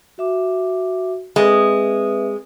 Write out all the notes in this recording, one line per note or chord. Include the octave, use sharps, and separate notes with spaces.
F#4 E5 D6
G#3 C4 B4 E5